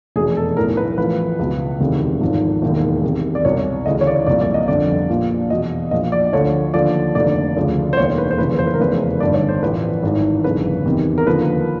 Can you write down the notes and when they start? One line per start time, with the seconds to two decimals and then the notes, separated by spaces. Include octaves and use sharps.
0.16 F1 E2 B2 G#4
0.37 A4
0.57 B1 A2 E3 A#4
0.77 B4
0.98 A1 A2 F3 B4
1.39 C#2 B2
1.80 E1 D2 C3 D#3
2.21 G#1 G#2 F3
2.62 E1 D#2 D#3
3.03 E2 C3 D#3
3.35 D5
3.45 C2 B2 C#5
3.86 D2 C#3 E3 D#5
4.01 C#5
4.07 D5
4.27 C2 A#2 F3 D5
4.41 D5
4.54 D#5
4.68 G1 F2 D3 D5
5.10 A#1 A#2 F3
5.50 E2 B2 D#5
5.91 A#1 A#2 F3 D#5
6.12 D5
6.33 D2 D3 F3 C#5
6.74 D#2 D3 F3 D5
7.15 F1 D#2 D3 D5
7.57 D2 C#3 F3
7.93 C5
7.97 E1 D#2 D#3 C#5
8.18 B4
8.31 C5
8.38 F1 D#2 C#3 E3 B4
8.59 C5
8.67 B4
8.74 A#4
8.80 F1 E2 C#3 E3 B4
9.20 G1 G2 D#3 D5
9.34 C#5
9.49 C5
9.63 A1 A2 F3 B4
10.03 G#1 G#2 E3
10.44 G1 F2 C#3 B4
10.86 E2 C3 D#3
11.18 A#4
11.27 D#2 D3 F3 B4